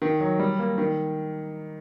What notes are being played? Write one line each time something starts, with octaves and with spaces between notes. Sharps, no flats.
D#3
F#3
G3
A#3
D#3